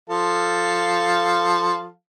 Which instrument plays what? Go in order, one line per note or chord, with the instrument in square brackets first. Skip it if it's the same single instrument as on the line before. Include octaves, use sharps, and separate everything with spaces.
[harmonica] F3 A4 F5